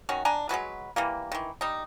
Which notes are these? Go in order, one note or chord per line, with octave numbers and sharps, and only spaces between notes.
D#3 C#4 F#4
D4 G#5 A#5
F#3 G#3 F#4 B4
E3 G3 A#3
D#3 E3
G3 D#4